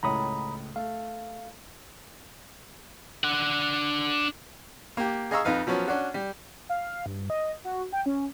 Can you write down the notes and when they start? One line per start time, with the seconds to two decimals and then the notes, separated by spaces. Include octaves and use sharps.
0.03 C#2 A2 C#5 A#5 B5 D#6
0.76 A3 F5
3.24 D4 F#5
4.97 A#3 G4
5.31 G#4 D#5 F5 A#5 C#6 E6
5.45 F2 D#4 B4 F5
5.67 F3 F#3 B3 C#4
5.88 C#4 D4 F#4
6.14 G3
6.69 F5
7.06 G2
7.30 D#5
7.64 F#4
7.92 G5
8.06 C#4